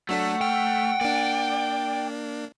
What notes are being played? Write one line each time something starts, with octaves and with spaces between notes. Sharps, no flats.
F#3 A3 D4 A4 F#5
G5 F6
A#3 D4 D5